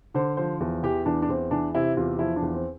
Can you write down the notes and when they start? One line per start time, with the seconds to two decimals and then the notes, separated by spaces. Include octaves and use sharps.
0.14 D3 C5
0.37 F3 C5
0.60 E2
0.83 E3 G4
1.06 E2 D4
1.22 D4
1.29 E2 C4
1.51 E3 D4
1.74 C3 E4
1.97 E2 F4
2.19 F3 E4
2.36 D4
2.42 E2
2.53 C4